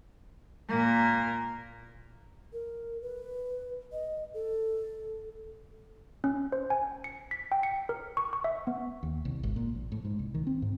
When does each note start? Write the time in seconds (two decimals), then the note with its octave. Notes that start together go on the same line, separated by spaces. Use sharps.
0.69 A#2 A#3
2.53 A#4
3.02 B4
3.92 D#5
4.34 A4
6.24 C#4
6.52 C5
6.70 G#5
7.04 C#7
7.31 B6
7.52 G5
7.63 C#7
7.89 A#4
8.17 C#6
8.33 C#6
8.44 E5
8.67 B3
9.03 D#2
9.25 C2
9.43 G#1
9.56 A#2
9.75 A#1
9.92 A2
10.05 G#2
10.19 C2
10.34 D#3
10.47 C4
10.62 G#2